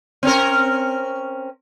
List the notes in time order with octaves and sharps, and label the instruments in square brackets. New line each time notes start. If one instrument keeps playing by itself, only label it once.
[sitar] C4 C#4 A#4